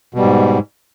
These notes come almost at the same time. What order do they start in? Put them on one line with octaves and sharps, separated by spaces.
B2 G3 G#2